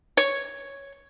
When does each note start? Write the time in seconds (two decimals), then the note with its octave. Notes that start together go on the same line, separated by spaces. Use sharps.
0.17 C#5